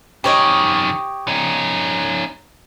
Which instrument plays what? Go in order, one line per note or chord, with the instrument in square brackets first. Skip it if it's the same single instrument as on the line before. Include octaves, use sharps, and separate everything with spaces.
[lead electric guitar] F#2 D#3 [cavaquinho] G4 C#5 D#5
[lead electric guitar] C#4 D#4